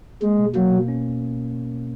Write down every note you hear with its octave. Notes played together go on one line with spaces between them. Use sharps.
G#3 A#3
B2
F#3 A#3
B2
C#4